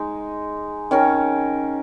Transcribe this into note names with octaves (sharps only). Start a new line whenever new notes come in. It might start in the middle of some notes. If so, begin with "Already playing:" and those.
Already playing: G#3 D#4
D#3 C#4 A#4